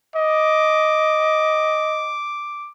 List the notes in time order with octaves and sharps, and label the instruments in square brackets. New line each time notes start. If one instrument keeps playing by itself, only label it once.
[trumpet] D#5 [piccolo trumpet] D6